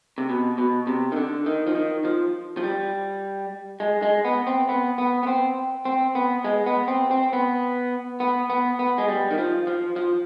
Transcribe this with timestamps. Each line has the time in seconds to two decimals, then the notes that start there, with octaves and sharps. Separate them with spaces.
0.18 C3
0.29 B2
0.58 B2
0.87 C3
1.12 D#3
1.16 D3
1.46 D#3
1.67 F3
1.75 D#3
2.05 F3
2.57 F3
2.63 G3
3.80 G#3
4.02 G#3
4.25 B3
4.47 C4
4.69 B3
4.98 B3
5.23 B3
5.27 C4
5.85 C4
6.15 B3
6.44 G#3
6.66 B3
6.88 C4
7.11 C4
7.33 B3
8.20 B3
8.50 B3
8.79 B3
8.98 G#3
9.08 G3
9.31 D#3
9.38 F3
9.67 F3
9.96 F3